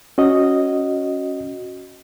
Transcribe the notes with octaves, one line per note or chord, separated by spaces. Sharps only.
C#4 F#4 D#5